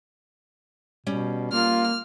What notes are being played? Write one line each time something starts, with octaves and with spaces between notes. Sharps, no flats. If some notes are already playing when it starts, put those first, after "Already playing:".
B2 G3 C#4
A#3 F4 F6